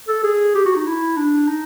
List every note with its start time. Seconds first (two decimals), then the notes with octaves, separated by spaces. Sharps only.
0.08 A4
0.23 G#4
0.55 G4
0.66 F#4
0.76 D#4
0.86 E4
1.17 D4
1.48 D#4